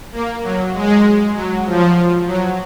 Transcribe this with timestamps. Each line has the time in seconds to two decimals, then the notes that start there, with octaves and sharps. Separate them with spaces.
0.13 A#3
0.43 F#3
0.74 G#3
1.34 F#3
1.65 F3
2.26 F#3